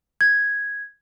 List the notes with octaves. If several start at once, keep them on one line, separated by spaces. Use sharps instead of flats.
G#6